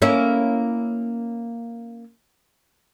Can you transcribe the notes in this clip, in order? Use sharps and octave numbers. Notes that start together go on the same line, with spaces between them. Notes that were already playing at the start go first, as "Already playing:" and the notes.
A#3 C#4 E4